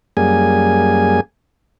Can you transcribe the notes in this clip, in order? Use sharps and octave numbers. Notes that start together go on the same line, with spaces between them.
F#2 G3 A#3 G#4 G#5